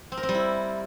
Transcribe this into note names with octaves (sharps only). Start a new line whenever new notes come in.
C4
A#4
C4
G3
E4